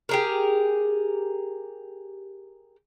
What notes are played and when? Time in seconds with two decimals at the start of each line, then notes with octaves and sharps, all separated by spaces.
0.09 G4 G#4 A#4